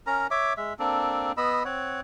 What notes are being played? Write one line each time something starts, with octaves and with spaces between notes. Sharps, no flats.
C#4 A#4 A#5
C#5 E5 D6
G#3 E5
A#3 C4 D4 A4
B3 D#5 B5 E6
C4 C#5 F#5